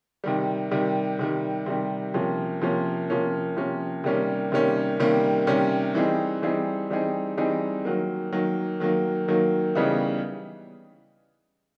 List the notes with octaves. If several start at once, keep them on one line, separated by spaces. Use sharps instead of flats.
C3 D#3 G3
C3 D#3 G3
C3 D#3 G3
C3 D#3 G3
C3 F3 A#3 C#4
C3 F3 A#3 C#4
C3 F3 A#3 C#4
C3 F3 A#3 C#4
C3 D#3 G3 A#3 C#4
C3 D#3 G3 A#3 C#4
C3 D#3 G3 A#3 C#4
C3 D#3 G3 A#3 C#4
E3 G3 C4 D#4 G#4
E3 G3 C4 D#4 G#4
E3 G3 C4 D#4 G#4
E3 G3 C4 D#4 G#4
D#3 F#3 A#3
D#3 F#3 A#3
D#3 F#3 A#3
D#3 F#3 A#3
C#3 E3 G3 B3 D#4